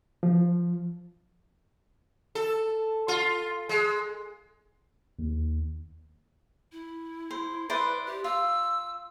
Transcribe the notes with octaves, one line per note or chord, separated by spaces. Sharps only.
F3
A4
F4
G#3
D#2
E4
C5
E4 B4 C5 D5
G4
F4 E6